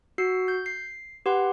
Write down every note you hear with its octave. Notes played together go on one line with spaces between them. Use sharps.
F#4 E6 C7 C#7
G6
C7
G4 B4 F#5 C6